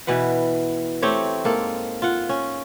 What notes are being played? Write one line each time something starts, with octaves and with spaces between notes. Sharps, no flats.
B2 E3 B4 F#5
A3 C4 G4 C#5
G#2 A#3 A4
F4 F#5
C#4